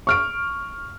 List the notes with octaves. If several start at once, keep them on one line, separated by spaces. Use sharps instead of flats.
C#6 F6 D7